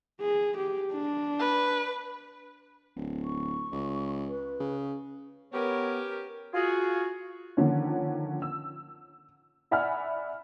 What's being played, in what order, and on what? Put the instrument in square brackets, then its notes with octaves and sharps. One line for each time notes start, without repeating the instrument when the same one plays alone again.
[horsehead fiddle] G#4
G4
D4
[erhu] B4
[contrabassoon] D1
[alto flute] C#6
[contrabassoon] C#2
[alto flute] B4
[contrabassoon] C#3
[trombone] B3 [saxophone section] C#4 G4 [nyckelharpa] A#4 [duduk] C#5
[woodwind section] F4 F#4 G#4
[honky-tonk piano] D3 D#3 F3 A#3 C#4
E6
D5 E5 F#5 G#5 B5 F6